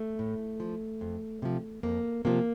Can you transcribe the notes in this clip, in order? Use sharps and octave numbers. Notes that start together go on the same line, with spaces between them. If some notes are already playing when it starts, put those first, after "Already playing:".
Already playing: A3
A2
F3
F2
C3 F3
F2 A#3
C3 F3 A#3